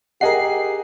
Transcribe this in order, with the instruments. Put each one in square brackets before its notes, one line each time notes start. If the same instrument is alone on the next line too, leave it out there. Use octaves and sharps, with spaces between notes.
[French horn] G4 [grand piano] G#4 D#5 F#5 [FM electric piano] A#4 C7